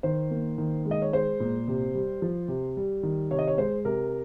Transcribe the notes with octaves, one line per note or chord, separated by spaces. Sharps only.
D#3 C5
A#3
D#3
G#3
D#5
C#5
G#3 C5
A#2
C3
G3
F3
C3
G3
D#3
C3 C#5
D#5
C#5
G#3 C5
C3 A#4